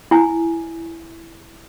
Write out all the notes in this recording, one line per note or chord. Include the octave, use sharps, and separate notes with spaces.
E4 G#5